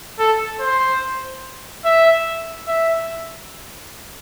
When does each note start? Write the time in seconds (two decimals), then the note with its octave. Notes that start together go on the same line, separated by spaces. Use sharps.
0.19 A4
0.60 C5
1.85 E5
2.67 E5